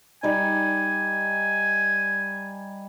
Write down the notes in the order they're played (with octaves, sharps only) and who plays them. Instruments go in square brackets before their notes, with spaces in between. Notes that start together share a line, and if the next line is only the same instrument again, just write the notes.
[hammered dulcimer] G3 D#4 [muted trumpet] G#5